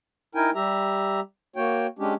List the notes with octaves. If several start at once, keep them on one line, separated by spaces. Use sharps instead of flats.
D#4 E4 A#4 G5 G#5
G3 G4 E5 A#5
A#3 F#4 C#5 G5
G#3 C#4 D4 G4